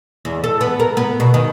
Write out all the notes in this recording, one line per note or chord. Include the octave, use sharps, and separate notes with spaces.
E2
A4
B3
A#4
B3
B2
D#3